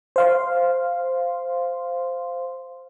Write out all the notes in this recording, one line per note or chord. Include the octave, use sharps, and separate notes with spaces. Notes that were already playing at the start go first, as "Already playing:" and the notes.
C5 F5 C6